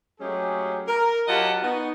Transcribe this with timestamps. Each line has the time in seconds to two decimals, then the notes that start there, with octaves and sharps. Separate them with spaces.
0.20 F#3 G#3 A3 C#4 G4 G#4
0.87 A#4
1.28 F#3 F4 G4 D#5 F#5 A5
1.63 B3 D#4 F#4